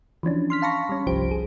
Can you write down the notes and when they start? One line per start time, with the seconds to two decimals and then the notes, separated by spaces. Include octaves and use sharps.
0.23 E3 F3 C#4 D4
0.50 C6 F6 B6
0.62 F5 A5 B5 C#6 A#6
0.89 G3 C#4
1.07 G1 C2 F3 G4 C5 D7
1.31 G#4